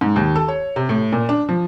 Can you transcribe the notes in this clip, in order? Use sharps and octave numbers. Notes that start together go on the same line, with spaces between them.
G#2
D#2
A4
C#5
C3
A2
A#2
D4
F3